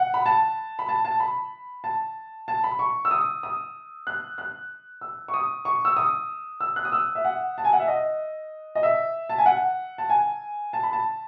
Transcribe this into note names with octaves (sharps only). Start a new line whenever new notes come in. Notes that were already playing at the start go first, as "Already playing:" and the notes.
Already playing: F#5
B5
A5
B5
A5
A5
B5
A5
A5
B5
C#6
E6
D#6
D#6
F#6
F#6
E6
C#6
D#6
C#6
E6
D#6
E6
F#6
D#6
E6
E5
F#5
A5
G#5
F#5
E5
D#5
D#5
E5
A5
G#5
F#5
A5
G#5
A5
B5
A5